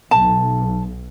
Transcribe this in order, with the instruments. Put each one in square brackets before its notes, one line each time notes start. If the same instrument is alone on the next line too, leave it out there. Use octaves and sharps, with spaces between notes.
[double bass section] B1 [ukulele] A5